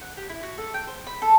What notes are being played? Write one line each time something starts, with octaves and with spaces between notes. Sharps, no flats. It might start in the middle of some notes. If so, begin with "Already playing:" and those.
F#5
G4
E4
F#4
A4
G5
C5
B5
A4